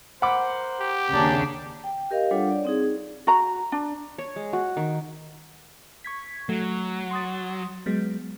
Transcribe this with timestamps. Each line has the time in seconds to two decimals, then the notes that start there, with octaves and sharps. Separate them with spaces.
0.22 A#4 C5 F#5 B5 D6
0.80 G4
1.13 D#2 C#3 D4 A#4 D5 G#5
1.84 G5
2.11 G4 A#4 D#5 F5
2.31 G3 D4 F4 A4 C#5 F#5
2.50 D5
2.65 C4 D#4 G#4
2.80 D#4
3.27 F#4 A#5
3.72 D4
4.18 C#5
4.36 G#3
4.53 F#4
4.77 D#3
6.04 C#6 G#6 B6
6.49 F#3 A3
7.11 C6 D#6 A6
7.86 F#3 G#3 B3